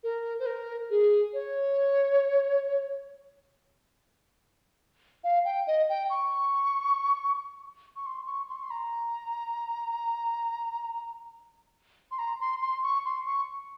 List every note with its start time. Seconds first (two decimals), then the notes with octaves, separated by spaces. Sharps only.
0.03 A#4
0.39 C5
0.46 A#4
0.90 G#4
1.33 C#5
5.24 F5
5.45 G5
5.67 D#5
5.89 G5
6.10 C#6
7.96 C#6
8.06 C6
8.27 C#6
8.49 C6
8.56 C#6
8.63 C6
8.71 A#5
12.11 C6
12.19 A#5
12.40 C6
12.62 C6
12.83 C#6
13.05 C6
13.26 C#6